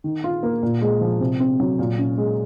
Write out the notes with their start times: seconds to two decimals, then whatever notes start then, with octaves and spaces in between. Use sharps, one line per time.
0.04 D#3
0.24 F4
0.43 A#3
0.63 A#2
0.81 G#3
1.01 F3
1.21 C3
1.40 C4
1.60 F#3
1.79 A#2
1.98 C#4
2.18 G#3